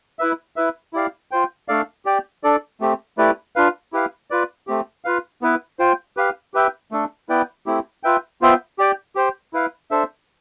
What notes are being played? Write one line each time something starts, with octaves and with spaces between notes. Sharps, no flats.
E4 B4 E5
E4 B4 E5
E4 G4 D5 F5
F4 C5 G5
A3 D4 A4 D5 F5
G4 D5 G5
D4 A4 D5
A3 C4 G4
A3 E4 G4 B4 D5
D4 F4 B4 F5
E4 G4 B4 F5
F4 B4 D5
A3 C4 G4
F4 B4 F5
B3 E4 B4
F4 C5 G5
G4 B4 F5
G4 B4 E5 G5
A3 D4 A4
B3 E4 B4 D5 G5
A3 C4 E4 G4
F4 B4 E5 G5
B3 F4 C5 E5 G5
G4 D5 G5
G4 C5 G5
E4 B4 F5
D4 A4 C5 E5